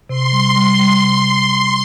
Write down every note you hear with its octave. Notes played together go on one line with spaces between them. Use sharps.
C3 C6
G3
G3
G3
C3